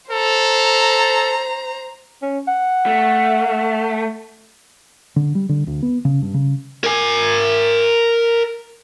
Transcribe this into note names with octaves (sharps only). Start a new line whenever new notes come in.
A4 C5 A#5
C#4
F#5
A3
D3
G3
D3
D2
B3
C#3
G2
C#3
A#4 G#5